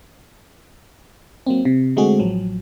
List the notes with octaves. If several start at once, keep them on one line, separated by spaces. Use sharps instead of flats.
F#3 A#3 C4
C3
D3 G#3 A3 C4 F#4 G#4
A1 F3 F#3